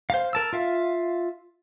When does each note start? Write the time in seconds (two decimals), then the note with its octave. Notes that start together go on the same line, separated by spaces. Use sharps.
0.10 C5 F5
0.33 A#4 A5 E6
0.53 F4 E5 F5